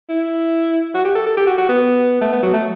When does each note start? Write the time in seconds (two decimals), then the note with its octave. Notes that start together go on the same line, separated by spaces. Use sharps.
0.09 E4
0.94 F#4
1.05 G4
1.15 A4
1.26 A4
1.37 G4
1.47 F#4
1.58 F#4
1.69 B3
2.21 A3
2.32 B3
2.42 F#3
2.53 A3